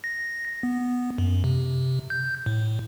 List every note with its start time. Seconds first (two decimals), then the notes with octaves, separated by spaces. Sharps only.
0.04 A#6
0.63 B3
1.18 F#2
1.44 C3
2.10 G6
2.46 A2